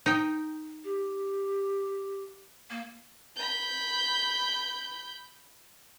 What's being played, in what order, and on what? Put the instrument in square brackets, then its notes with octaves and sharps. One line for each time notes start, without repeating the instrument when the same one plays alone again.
[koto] D#4 G5
[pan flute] G4
A#3
[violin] B5 G6